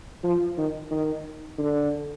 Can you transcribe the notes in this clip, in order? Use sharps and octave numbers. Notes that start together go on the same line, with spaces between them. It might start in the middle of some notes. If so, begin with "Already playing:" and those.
F3
D#3
D#3
D3